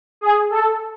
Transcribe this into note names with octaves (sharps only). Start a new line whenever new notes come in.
G#4
A4